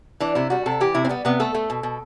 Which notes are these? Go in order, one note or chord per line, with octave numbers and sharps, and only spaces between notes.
E3 D4
C3 E4
G3 F#4
C3 A4
E3 G4
C3 E4
C4
G3 B3
C3 B3
A3 A4
A3
B2
B2